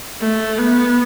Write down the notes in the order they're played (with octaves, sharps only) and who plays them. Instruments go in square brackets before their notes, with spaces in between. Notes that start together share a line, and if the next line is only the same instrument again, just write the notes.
[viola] A3
B3